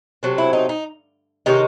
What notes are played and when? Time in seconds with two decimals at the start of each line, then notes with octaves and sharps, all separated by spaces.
0.23 C3 F#3 A3 C4
0.38 E4
0.53 D#4
0.69 D#4
1.46 C3 D#3 G#3 C#4 D#4